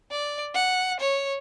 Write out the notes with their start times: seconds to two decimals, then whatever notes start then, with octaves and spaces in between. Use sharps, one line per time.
0.11 D5
0.55 F#5
1.00 C#5